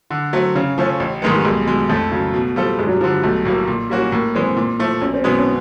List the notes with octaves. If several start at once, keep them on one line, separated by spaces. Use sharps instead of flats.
D3
F#3 A3 C4
C#3 C#4
F3 A3 C#4 F4
A1
G#2 D#3 G#3 A3 B3
G3
B1 G#3
B2 G#3
F2 A3
C#3 F#3
B2
G3 C4 F4 A4
G2 G#3
F#3
G3
D3 F3
B1 A3
A2 F#3 A#3
A#2
G3 A#3 C#4 F#4
A2 A#3
E3 G#3 C4
A#2
F3 A3
B1 C#4
C4
B2 G#3 B3 C#4
C#4